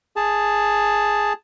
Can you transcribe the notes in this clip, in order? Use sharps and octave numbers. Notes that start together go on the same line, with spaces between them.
G#4 A5